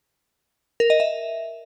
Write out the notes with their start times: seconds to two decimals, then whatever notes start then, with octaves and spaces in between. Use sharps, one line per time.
0.80 A#4
0.90 D#5
1.00 E5